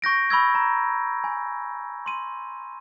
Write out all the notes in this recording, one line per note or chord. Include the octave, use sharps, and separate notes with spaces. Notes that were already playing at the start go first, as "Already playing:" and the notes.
C#6 G6 A#6 D7
B5 C#6 E6 G#6
A#5
G#5
C6 D#7